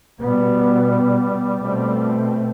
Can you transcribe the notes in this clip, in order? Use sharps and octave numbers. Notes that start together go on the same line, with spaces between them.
B2 G3 B3
B2 A3 C4